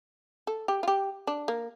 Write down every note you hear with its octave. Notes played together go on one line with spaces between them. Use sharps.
A4
G4
F4
G4
D4
A#3